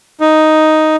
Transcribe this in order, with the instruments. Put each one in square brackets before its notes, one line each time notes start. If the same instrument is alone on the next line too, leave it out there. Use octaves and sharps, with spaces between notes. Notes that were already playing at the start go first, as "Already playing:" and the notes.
[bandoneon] D#4